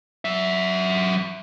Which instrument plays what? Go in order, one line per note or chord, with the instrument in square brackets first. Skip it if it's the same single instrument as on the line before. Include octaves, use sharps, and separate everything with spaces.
[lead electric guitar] F#3 E5